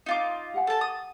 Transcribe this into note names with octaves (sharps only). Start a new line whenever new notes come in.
D#4 F4 D6
G4 F#5 G#5
A4 A5
D#6